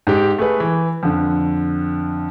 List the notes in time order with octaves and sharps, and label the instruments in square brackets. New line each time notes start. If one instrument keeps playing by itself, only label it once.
[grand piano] G#2 G4
A3 G#4 B4
E3
F2 D3